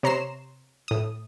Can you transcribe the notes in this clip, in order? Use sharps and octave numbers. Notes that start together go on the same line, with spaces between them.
C3 C#5 A#5 C6 C7 E7
A2 D#6